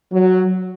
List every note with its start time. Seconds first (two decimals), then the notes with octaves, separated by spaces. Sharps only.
0.13 F#3